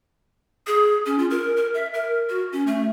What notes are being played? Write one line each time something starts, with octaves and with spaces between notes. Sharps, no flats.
G#4
C#4
F4
A#4
A#4
E5
A#4
F#4
C#4
A3